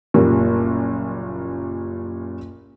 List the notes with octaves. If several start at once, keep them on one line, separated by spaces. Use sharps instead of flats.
F#1 A#2 G3 A#3